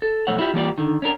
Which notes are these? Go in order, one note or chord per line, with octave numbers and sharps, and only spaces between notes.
A4
B1 F2 A3 C#5 F#5
E4 F4 G4 E5
E3 G3 A#3 F4 G4 D5
D3 D#3
C#4 D4 A#4